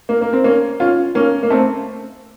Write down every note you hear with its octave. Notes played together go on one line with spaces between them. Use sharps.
A#3
A#3
C4
A#3 C#4
C#4 F4
A#3 C#4
A#3
A3 C4